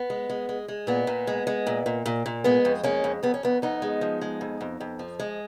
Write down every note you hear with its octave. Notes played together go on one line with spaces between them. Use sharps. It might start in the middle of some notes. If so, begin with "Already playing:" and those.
Already playing: B3
G#3
G#3
G#3
G#3
A#2 B3
A#2
G#3
G#3
A#2
A#2
A#2
A#2
G#3 B3
F2
G#3 A#3 C#4
F2
F2 B3
C#4
F2 B3
F2 B3 D#4
G#3
F3
G#3
F2
F2
F2
F3
G#3